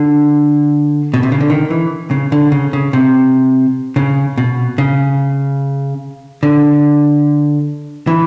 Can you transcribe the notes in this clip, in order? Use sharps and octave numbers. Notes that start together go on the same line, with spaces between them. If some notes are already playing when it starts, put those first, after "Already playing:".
Already playing: D3
B2
C3
C#3
D3
D#3
E3
C#3
D3
C#3
C#3
C3
C#3
B2
C#3
D3
E3